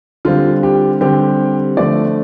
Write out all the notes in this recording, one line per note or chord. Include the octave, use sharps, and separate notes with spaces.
D3 G3 C4 F4
G4
D3 G3 C4 G4
D3 F3 A3 D5